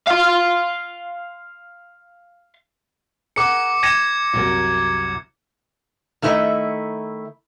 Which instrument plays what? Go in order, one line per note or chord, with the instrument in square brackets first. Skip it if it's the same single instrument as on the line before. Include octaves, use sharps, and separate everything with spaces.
[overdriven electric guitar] F5 C6
[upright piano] G#4 A#4 F#5 [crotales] D6 C#7
[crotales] G#6 C#7 [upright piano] A#6 D#7 E7
[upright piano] C2 F#2 A#4
[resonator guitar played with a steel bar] D#3 A3 E4 B4 D#5 E5